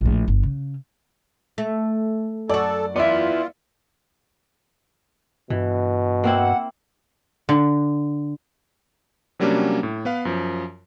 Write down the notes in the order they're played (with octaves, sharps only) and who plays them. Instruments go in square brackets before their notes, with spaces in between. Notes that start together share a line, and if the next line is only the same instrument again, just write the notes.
[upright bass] A#1 A2
G1
C#3
[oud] A3
[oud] F#2 F#4 [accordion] A4 [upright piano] D5
[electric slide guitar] B3 E4 [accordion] F4 [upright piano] D5 E5
[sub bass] G2 [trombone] B2 [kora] E3
[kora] A#3 C4 E4 [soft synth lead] F#5
[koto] D3
[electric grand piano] C3 F#3 G3 A#3 C#4 D4
A2
B3 B4 F5
F#2 F3